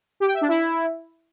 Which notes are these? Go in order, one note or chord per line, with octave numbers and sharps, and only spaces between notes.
G4
G5
E5
D4
E4